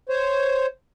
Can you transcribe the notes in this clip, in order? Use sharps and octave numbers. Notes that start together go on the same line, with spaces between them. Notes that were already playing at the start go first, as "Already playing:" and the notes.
C5 C#5